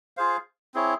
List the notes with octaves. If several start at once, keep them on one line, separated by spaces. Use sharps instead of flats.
F4 G#4 C5 F5
C4 E4 G#4 C#5